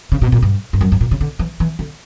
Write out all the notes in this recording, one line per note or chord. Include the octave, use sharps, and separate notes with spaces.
C#3
B2
A#2
G2
G2
F#2
G2
A#2
C#3
D3
E3
E3
D3